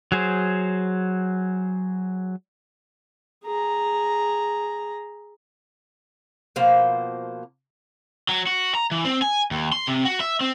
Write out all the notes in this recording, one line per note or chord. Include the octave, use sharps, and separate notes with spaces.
F#3 G#4 C5
G#4 A#5
B2 F3 A#3 C5
F#3
F#4
A#5
E3
C4
G#5
D#2
C6
C3
F#4
E5
C4